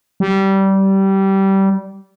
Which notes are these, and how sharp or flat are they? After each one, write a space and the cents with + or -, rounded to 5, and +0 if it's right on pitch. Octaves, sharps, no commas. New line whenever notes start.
G3 -20